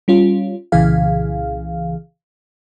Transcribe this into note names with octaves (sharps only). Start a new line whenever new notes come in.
G3 C#4 F4
C2 A#2 C#3 E3 G#4 F5